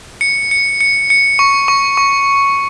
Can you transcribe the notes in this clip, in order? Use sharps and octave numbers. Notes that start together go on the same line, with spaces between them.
C#7
C#7
C#7
C#7
C#6
C#6
C#6